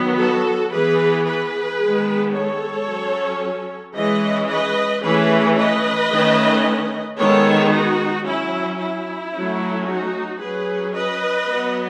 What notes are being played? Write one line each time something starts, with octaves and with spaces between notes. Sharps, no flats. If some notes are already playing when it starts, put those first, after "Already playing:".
Already playing: D#3 F#3 B3
F#4 A4
E3 B3 G#4 B4
G#4 B4
D#3 G#3 B3
A4 C#5
F#3 C#4
E3 G#3 C#4 B4 D#5
B4 D#5
E3 A3 C#4 G#4 B4
B4 D#5
D#3 A3 C#4
D#3 G#3 B3 A4 C#5
D#4 F#4
F#3 C#4 E4
E4
F#3 A3 C#4
D#4 F#4
F#3 C#4 G#4 B4
B4 D#5
F#3 B3